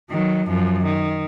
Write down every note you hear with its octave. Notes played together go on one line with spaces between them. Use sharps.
D#3 F#3
F#2 F3
D#3